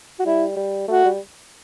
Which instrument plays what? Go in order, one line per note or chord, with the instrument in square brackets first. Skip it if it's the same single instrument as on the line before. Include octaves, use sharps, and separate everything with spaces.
[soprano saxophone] F#4
[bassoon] G3 [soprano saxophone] E4
[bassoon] G3
[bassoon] A3 [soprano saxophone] F#4
[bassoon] G3